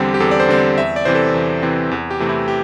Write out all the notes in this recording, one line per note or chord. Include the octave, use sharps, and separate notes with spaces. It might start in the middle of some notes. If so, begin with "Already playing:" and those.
Already playing: E2 D3 G3 C4 G4
G4
E2 A4
D5
C5
D3 G3 C4
E2 E5
D5
C3 E3 C4 C5
A4
E2
C3 E3 C4
E2
G4
C3 E3 A3 C4
E4
G4